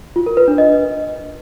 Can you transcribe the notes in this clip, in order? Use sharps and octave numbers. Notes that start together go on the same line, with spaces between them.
F4
A#4
B4
D4
D#5